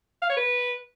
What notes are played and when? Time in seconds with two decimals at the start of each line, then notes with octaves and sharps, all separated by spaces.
0.22 F5
0.29 C#5
0.37 B4